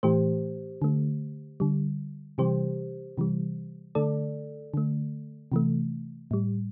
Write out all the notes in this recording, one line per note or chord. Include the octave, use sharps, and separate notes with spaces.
A2 E3 A3 G4 C5
D3 A3
D3 G3
C3 E3 G3 G4 C5
C3 E3 G3
D3 A3 A4 D5
D3 A3
C3 E3 A3
A2 G3